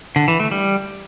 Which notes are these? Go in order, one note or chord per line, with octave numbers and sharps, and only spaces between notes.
D3
E3
A3
G3